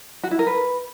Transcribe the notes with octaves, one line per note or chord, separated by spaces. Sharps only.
F#4
E4
A#4
B4